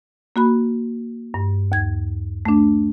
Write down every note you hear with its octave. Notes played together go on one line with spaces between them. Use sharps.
A#3 F#4 B5
G2
D#2 G#6
A3 D4